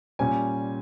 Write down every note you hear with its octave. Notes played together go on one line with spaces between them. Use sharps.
A#2 G3 C#4 G#5